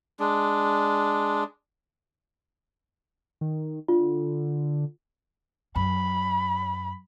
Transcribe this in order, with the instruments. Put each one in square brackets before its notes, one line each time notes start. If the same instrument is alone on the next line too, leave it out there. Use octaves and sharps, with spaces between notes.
[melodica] G#3 D4
[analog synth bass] D#3
[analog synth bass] D3 [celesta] F4
[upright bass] F#2 [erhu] B5